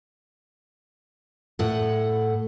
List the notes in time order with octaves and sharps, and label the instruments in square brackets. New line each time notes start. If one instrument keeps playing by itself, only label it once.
[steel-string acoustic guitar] A2 A4 F#5